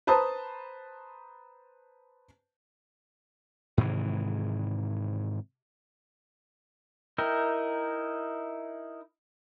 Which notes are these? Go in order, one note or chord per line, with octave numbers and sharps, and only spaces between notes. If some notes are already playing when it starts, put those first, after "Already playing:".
B4 C5 A5 A#5 D#6
G#2 C3 D#3 E3
D#4 E4 A#4 G5